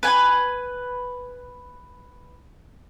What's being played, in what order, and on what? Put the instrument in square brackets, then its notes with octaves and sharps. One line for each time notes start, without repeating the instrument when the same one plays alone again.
[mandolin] B4 G#5